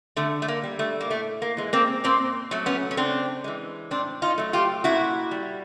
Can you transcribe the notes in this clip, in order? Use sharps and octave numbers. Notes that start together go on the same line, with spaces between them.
D3 A3
A3
A#3
G3
A3
A#3
A2 A3
A#3
E3 G#3
A#3 C4
A#2 A#3 C4
F#3 A3
B3 C#4
C#4
C#3 C4 D4
E3 G#3
A2 C4 D4
D#4 F4
F#3 A3
F4 G4
A#2 E4 F#4
G3